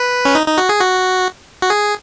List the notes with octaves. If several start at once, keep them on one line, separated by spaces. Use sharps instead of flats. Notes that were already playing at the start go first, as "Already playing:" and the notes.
Already playing: B4
C#4
D#4
D#4
F#4
G#4
F#4
F#4
G#4